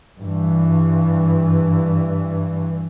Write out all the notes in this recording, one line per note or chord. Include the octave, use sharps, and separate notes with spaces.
G2 E3